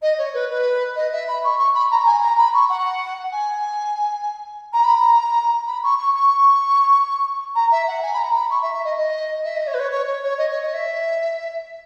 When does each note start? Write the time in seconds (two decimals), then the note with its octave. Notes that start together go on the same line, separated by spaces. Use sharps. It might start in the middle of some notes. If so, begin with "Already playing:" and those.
0.02 D#5
0.17 C#5
0.34 B4
0.49 B4
0.96 D#5
1.12 E5
1.27 B5
1.44 C#6
1.58 C#6
1.74 B5
1.91 A#5
2.05 G#5
2.21 A#5
2.37 B5
2.53 C#6
2.69 F#5
3.31 G#5
4.73 A#5
4.83 B5
4.95 A#5
5.66 B5
5.83 C#6
5.98 C#6
6.14 C#6
7.55 A#5
7.71 E5
7.87 F#5
8.02 G#5
8.13 B5
8.17 A#5
8.34 B5
8.50 C#6
8.62 E5
8.73 E5
8.84 D#5
8.97 D#5
9.44 E5
9.55 D#5
9.67 C#5
9.73 B4
9.79 C#5
9.91 C#5
10.06 C#5
10.22 C#5
10.38 D#5
10.50 C#5
10.62 D#5
10.73 E5